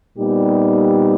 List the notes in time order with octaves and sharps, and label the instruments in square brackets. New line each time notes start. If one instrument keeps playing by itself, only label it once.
[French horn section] A#2 G3 B3 D#4 G4